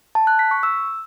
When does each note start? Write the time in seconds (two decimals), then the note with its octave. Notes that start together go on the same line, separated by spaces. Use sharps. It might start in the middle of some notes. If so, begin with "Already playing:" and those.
0.15 A5
0.27 F#6
0.39 B6
0.51 C#6
0.63 E6